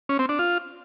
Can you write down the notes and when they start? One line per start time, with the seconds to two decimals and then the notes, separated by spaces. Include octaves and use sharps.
0.09 C#4
0.19 C4
0.29 D4
0.39 F4